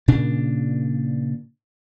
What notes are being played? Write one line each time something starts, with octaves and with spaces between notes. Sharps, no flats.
A#2 C#3 D4